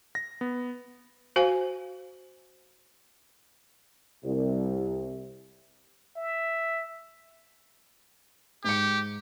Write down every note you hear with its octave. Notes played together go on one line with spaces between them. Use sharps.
A#6
B3
F#4 C5 F5 G#5
C2
E5
G#2 G4 C#7